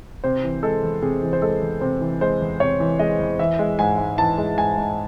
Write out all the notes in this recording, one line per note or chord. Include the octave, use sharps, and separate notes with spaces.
C3 C5
E3
G#3 A4
E2
C3 G#4
E3
C5
G#3 A4
E2
C3 C5
E3
G#3 C5
E2
C3 C#5
E3
G#3 D#5
E2
E3 E5
G#3
G#2 G#5
G#2
E3 A5
G#3
G#2 G#5
G#2